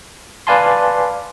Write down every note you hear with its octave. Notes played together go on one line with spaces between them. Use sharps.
B4 D5 F5 G#5 A5 C6